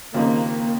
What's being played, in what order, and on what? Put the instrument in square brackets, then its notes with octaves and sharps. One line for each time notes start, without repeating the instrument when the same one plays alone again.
[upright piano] D#2 C#3 F3 C4 D#4 [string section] A#3